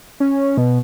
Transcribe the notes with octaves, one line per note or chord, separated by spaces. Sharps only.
C#4
B2